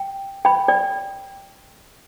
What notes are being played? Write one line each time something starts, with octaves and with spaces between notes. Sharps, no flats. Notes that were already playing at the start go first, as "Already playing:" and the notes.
Already playing: G5
G5 B5
D5 G5